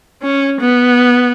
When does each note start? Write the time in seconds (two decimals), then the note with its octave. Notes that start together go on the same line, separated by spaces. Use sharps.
0.22 C#4
0.60 B3